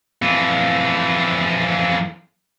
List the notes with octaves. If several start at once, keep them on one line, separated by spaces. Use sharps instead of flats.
F2 E3